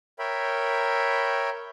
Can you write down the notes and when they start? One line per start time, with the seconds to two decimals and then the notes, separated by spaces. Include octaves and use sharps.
0.19 A#4 C#5 E5 G5 B5